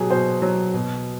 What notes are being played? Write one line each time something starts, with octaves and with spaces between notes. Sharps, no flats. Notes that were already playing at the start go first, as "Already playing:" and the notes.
Already playing: B2 F#3 G4 G#4
B2 C5
F#3
B2